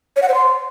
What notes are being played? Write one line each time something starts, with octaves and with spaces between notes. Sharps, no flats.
C#5
F#5
C5
C6